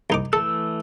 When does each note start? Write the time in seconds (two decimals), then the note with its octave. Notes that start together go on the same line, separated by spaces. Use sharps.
0.10 C2 D#4 D6
0.33 E3 A3 A4 E6